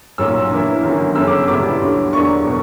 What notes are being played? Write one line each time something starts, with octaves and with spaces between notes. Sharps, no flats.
B1 A#2 F#3 C#4 E6
G2 E3 A#3 E4
G1 F#2 D3 F#3
G1 F#2 C#3 F#3 C#4 E6
D6
A#2 G3 B3 E4 D6
D2 D3 F#3
E2 D3 F#3 A#3 D4 C#6
B2